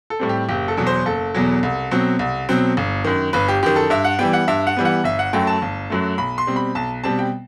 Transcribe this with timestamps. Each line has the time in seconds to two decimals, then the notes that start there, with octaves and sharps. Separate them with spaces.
0.10 A4
0.19 A2 G3 C4
0.29 G4
0.49 F#1 G4
0.68 A4
0.77 E2 B2 F#3
0.87 C5
1.05 F#1 A4
1.35 E2 B2 F#3
1.63 C2
1.91 B2 F#3 C4
2.19 C2
2.49 B2 F#3 C4
2.77 G1
3.05 F#2 D#3
3.33 G1 B4
3.48 G4
3.63 F#2 D#3 G4
3.76 A4
3.90 G2 E5
4.04 F#5
4.19 E3 G3 B3 G5
4.33 F#5
4.48 G2 E5
4.67 F#5
4.77 E3 G3 B3
4.85 F#5
5.04 G1 E5
5.19 F#5
5.33 F#2 F#3 A3 G5
5.47 A5
5.62 G1
5.90 F#2 F#3 A3
6.18 B1 B5
6.38 C6
6.47 B2 G3 C4
6.56 B5
6.75 B1 A5
7.04 B2 G3 C4 A5
7.19 G5